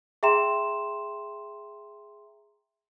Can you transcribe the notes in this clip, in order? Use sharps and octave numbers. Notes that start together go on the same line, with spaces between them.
G#4 E5 G5 A#5 C6 E7